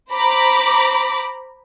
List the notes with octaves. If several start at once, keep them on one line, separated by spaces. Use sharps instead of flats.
C5 A#5 B5 D6